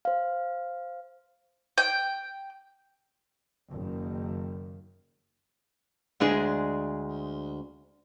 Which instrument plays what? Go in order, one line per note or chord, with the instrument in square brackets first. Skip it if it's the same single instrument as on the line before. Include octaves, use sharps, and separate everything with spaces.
[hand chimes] C5 F5
[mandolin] G5
[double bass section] F#1 D#3
[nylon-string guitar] D2 G#3 D4 G#4